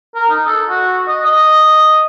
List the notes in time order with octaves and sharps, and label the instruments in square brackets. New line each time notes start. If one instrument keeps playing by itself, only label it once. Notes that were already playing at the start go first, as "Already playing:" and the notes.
[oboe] A#4
D#4
A4
F#4
D#5
D#5